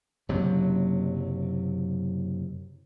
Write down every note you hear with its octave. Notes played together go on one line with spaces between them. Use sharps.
F#1 C3 F#3